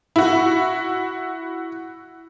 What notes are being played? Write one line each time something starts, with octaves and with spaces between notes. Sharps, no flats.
E4 F#4